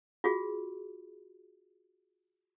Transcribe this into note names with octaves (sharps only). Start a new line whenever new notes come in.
F4 F#4 G#4